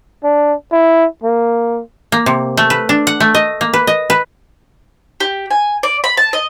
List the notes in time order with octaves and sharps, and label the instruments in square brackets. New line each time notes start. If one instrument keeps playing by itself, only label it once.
[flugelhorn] D4
E4
A#3
[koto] A#3
C3
A3
B4
D4
F#5
A3
D#5
A#3
B4
D#5
B4
[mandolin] G4
G#5
D5
B5
A5
D#5